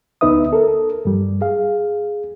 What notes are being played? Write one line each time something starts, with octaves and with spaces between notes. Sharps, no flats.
D2 B3 D#4 B4 E5 D#6
A4 A#4
G2 G3
G#4 F5